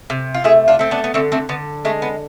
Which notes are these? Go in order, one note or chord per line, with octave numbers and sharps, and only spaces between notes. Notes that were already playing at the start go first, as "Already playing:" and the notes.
C3
F4
A3 E4 G#4
D4 F4
A3 C4
B3 D4
B3
D3 A3 C4
A3 C4
D3 B3
G#3 A3
B3